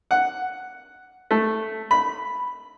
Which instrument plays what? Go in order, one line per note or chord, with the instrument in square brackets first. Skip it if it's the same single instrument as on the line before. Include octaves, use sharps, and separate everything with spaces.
[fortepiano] F#5
A3
B5